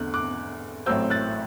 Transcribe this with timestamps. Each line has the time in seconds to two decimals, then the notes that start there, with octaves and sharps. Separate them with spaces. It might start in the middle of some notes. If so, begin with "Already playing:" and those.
Already playing: E2 D3 A3 F#6
0.14 D6 F#6
0.86 A1 A2 F#3 C4 E6 G6
1.10 F#6 A6